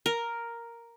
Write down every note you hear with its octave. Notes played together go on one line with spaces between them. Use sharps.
A#4